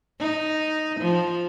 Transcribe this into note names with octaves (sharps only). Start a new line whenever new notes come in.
D#4
F3